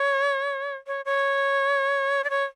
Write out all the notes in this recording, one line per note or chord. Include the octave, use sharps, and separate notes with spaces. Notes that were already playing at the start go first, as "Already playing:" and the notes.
Already playing: C#5
C#5
C#5
D5
C#5